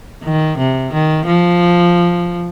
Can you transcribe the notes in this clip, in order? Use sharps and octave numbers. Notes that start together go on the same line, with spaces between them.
D#3
C3
D#3
F3